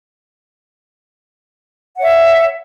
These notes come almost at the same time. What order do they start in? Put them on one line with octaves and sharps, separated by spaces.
F#5 C#5 E5